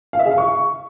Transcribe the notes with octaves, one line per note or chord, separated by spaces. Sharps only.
F5
E5
G#4
F5
C#6